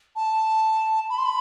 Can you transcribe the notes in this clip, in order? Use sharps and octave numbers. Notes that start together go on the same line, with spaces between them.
A5
B5
C6
B5